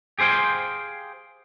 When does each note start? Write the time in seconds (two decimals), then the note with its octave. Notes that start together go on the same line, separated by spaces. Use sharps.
0.19 G4 G#4 C5 F5 G5